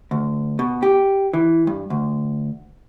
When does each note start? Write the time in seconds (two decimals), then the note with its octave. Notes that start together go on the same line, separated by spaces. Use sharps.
0.11 D2
0.59 B2
0.83 G4
1.33 E3
1.67 G2
1.90 D2